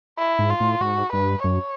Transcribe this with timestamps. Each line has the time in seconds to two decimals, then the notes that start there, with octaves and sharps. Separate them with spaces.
0.19 E4
0.39 G#2
0.50 F4
0.60 A2
0.81 G#2 F#4
1.13 G2 B4
1.44 F#2 C#5